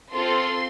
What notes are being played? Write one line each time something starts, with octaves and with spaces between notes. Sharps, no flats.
C4 F4 A4 C6